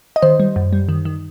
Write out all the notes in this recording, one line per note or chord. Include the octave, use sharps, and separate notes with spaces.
D#5
D#3 C5
G3
F#2
G3
D#3
D#3